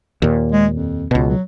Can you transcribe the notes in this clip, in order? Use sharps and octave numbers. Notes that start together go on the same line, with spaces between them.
D#2 A#2
G#3
F2
C#2 B2
F#3